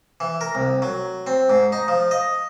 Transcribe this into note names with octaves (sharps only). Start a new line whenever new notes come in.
E3
A#4
C2
F#3
C4
G#2
D#4
F3
D#5